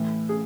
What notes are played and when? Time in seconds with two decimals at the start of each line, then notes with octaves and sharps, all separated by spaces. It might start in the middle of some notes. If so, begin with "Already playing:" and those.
Already playing: A2 E3
0.29 G#4